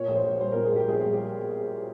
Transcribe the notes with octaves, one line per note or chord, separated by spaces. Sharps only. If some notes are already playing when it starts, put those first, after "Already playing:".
Already playing: A#2 C#5
A#1
C5
A#1
G3 C5
A#2 A#4
G#4
A#1 G4
A#1 G#4
G3 G#4
G4